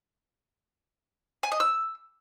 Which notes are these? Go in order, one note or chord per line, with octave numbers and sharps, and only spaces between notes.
G#5
D#5
E6